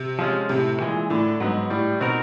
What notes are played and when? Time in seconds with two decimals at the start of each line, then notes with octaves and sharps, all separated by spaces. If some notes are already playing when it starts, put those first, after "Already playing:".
Already playing: C3
0.19 F3 G#3 C#4 F4
0.49 A2 C3
0.80 A#2 E3 G#3
1.10 A2 D3
1.40 G#2 F#3 B3
1.70 A2 G3
2.00 B2 C4 D#4 F#4 A#4